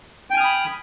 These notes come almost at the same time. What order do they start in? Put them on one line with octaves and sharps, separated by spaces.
G5 G#5 F6 D#6 B5